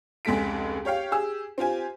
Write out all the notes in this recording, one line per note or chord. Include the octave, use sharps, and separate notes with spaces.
F1 C#2 G#3 A4 B6 D7
G4 C#5 F5 G5
G4 G#4 E6
C4 F4 G4 G#5